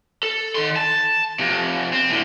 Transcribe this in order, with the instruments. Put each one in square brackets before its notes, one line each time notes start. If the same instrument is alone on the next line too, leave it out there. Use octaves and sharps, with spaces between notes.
[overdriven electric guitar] A4
D#3 C6
A5
F2 C3
C4
A2 D3